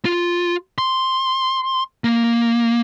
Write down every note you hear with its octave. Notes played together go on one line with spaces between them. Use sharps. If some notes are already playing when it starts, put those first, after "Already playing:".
F4
C6
A#3